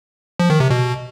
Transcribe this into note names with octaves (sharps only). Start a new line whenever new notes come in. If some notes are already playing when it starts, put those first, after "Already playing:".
F3
D#3
C3
B2